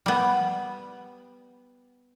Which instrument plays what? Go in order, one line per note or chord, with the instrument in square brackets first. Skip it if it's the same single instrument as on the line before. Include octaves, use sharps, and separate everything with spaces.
[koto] G3 B3